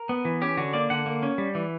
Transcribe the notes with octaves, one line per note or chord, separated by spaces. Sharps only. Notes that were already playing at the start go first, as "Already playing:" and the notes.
Already playing: A#4
B3
E3
C#4 G4
D3 F#4
A#3 D5
D3 F#5
A#3
C#4
G3
E3